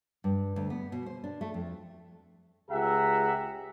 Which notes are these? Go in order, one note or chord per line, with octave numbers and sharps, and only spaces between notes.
G2
D2
B3
B2
C5
D4
A3
F2
C#2 G4 G#4 E5 F#5 A#5